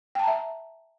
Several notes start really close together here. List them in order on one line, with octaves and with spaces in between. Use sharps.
G5 A5 A#5 E5